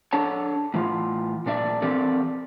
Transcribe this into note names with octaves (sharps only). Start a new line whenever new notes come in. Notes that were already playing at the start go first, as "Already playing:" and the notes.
D4 A4 C#5 A5
A2 E3 F4
A#2 D4 D5 E5
E3 C4 G4 A4 A#4 D5